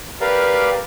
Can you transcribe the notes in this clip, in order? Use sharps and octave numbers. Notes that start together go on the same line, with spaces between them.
G4 A#4 B4 D5 F5